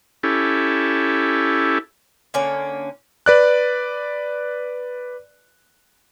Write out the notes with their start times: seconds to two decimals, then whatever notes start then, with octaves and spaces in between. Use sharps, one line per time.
0.23 C#4 E4 G4 A4
2.34 D3 A#3 C#4
3.26 B4 D5 F#6